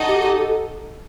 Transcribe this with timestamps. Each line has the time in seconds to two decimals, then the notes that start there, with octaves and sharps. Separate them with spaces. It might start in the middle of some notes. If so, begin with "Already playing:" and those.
Already playing: D#4 F#4 A4 D#5
0.08 G4
0.23 G4
0.39 A4